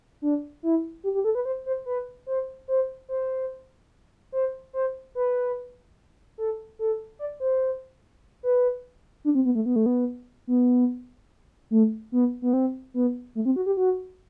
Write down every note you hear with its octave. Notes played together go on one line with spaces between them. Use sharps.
D4
E4
G4
G4
A4
B4
C5
C5
B4
C5
C5
C5
C5
C5
B4
A4
A4
D5
C5
B4
D4
C4
B3
A3
B3
A3
B3
B3
A3
B3
B3
C4
B3
A3
C4
F#4
G4
F#4